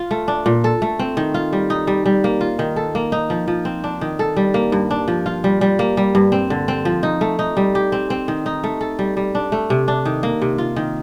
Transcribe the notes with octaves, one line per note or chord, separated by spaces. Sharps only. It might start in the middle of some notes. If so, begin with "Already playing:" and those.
Already playing: F4
A3
D4
A#2
A4
A3
C4
D#3
F4
G3
D#4
G3
G3
A#3
F4
D#3
A4
A#3
D#4
F3
F3
C4
D4
D#3
A4
G3
A#3
G2
D4
F3
F4
G3
G3
A#3
G3
G2
C4
D3
C4
F3
D#4
A3
D#4
G3
G4
C4
C4
D#3
D#4
A3
A4
G3
G3
D4
A3
C3
D4
D#3
A#3
C3
F4
D#3